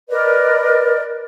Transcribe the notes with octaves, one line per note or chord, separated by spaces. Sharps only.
A#4 B4 D5 D#5